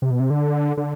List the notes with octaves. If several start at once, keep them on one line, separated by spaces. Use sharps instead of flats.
C3
B2
C3
D3
D3